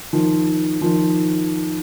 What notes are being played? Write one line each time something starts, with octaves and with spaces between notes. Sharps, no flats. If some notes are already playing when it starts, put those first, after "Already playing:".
D#3 F3
D#3 F3